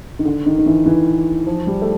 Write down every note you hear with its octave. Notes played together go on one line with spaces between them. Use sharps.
D#3
D3
D#3
D#3
E3
E3
F3
G3
A3